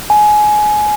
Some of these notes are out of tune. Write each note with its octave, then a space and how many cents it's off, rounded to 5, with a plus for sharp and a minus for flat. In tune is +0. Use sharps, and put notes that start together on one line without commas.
G#5 +20